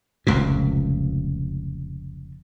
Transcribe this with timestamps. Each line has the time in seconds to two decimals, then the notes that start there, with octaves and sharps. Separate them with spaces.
0.27 F1 C#2 F#2 A#2